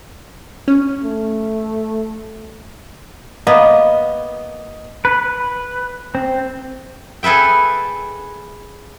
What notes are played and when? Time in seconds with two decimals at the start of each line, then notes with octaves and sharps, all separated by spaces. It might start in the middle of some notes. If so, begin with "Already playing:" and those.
0.68 C#4
1.04 A3
3.47 A#3 B3 D#5
5.05 B4
6.15 C4
7.23 G#4 A4 B4 E5 G5